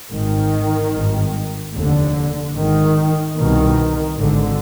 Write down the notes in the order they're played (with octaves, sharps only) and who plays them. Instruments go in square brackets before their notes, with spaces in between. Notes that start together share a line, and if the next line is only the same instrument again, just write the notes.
[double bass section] G#1 G#2 D#3
G#1 G2
F1 D#2 D3
G#1 G#2 D#3
C2 B2 D#3
G#1 G#2 D3